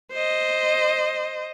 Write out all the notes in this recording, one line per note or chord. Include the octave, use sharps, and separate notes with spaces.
C5 D#5